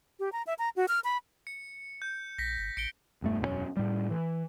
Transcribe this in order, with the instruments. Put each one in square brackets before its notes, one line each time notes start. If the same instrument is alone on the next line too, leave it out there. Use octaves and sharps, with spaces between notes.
[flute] G4
A#5
E5
A#5
F#4
F6
B5
[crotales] C#7
G6
[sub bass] A#1 [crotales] A#6 B6
[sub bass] G1
[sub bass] A1 [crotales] C#7 D7 G7
[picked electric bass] E1 G2 A3
E1 F#2 G3 C#4
A2 G3
E3